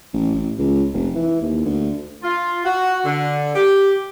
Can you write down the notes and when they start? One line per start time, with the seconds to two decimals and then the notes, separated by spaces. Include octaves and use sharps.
0.13 A1
0.35 A1
0.59 C#2
0.94 F1
1.15 E3
1.42 D#2
1.65 D2
2.23 F4
2.65 F#4
3.05 D3
3.55 G4